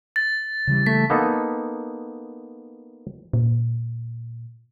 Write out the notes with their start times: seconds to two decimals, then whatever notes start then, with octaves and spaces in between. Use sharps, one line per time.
0.16 A6
0.67 C#3 E3 G3
0.86 A3 B6
1.10 A#3 B3 D#4 A4
3.33 A#2